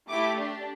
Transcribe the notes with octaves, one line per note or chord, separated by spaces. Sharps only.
A3 E4 G4 D6
D4 G4